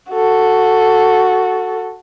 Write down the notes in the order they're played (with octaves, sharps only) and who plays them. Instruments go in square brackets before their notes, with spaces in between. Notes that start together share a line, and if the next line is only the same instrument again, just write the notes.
[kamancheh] F#4 A4